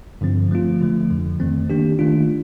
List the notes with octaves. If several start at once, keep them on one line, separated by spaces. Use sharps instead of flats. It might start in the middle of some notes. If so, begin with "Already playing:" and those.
G2 D3 F3 C4
F3 A3 C4 F4
D3 F3 A3
F2 D3 F3
F2 D#3 A3 C4
D#3 A#3 D4 G4
D#3 A3 D4 F4